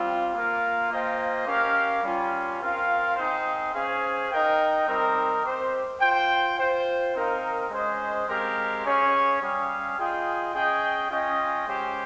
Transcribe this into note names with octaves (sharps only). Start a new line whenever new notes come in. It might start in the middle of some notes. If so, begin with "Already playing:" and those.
Already playing: G3 C4 F4
A#3 F4 A#4 F5
A#3 F4 C5 D#5 G5
C#4 G4 A#4 F5
G3 C#4 F4
C4 F4 A#4 F5
C4 D#4 G#4 C5
C#4 G#4 C5 F5
D#4 A#4 D#5 G5
G3 C4 D#4 A#4
C4 G4 C5
F4 C5 G5
F4 C5 G5
C4 D#4 A#4 F5
G#3 C#4 G#4 C5 D#5
G#3 C4 G4 A#4 F5
C#4 G#4 C#5 F5
G3 C#4 G#4 C#5 F5
F4 G#4 D#5 G5
C#4 G#4 D#5 G5
C#4 F4 G#4 D#5 G5
G#3 C#4 G4 C5 G5